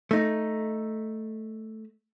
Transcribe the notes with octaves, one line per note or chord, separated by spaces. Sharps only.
A3 D#4